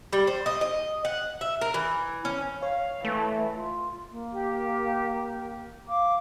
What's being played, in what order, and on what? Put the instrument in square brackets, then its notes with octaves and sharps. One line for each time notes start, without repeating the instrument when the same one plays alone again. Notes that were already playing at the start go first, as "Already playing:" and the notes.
[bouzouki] G3
C5
D#5
D#5
F#5
E5
A#4
E3
C#4
[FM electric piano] C#5 [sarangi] F5
[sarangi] E3 [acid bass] A3
[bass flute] F4
A#3
[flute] G4
[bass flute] F5 [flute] D6